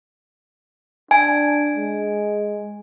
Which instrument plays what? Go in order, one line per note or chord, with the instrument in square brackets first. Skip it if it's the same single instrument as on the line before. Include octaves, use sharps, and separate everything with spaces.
[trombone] D4 [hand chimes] G#5
[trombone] G#3